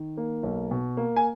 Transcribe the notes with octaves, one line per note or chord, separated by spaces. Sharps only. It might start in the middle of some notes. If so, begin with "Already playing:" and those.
Already playing: D#3
A#3
B1
B2
A#3
G#5